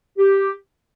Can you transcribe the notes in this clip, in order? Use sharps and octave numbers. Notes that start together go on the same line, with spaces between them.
G4